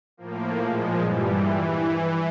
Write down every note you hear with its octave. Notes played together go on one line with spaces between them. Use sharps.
A2 F3 A#3
A#2 F3 G#3
G2 E3 G3
E3